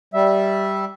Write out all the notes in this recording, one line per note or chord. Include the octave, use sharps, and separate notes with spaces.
G3 E5